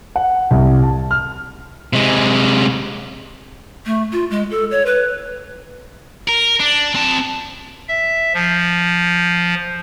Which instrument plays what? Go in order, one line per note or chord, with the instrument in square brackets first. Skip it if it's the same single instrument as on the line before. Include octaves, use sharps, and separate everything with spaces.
[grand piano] F#5
C2
A5
F6
[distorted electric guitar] C3 G#3
[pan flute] A3
F4
G#3
A4
C#5
B4
[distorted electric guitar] A#4
D4
C4 A5
[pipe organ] E5
F3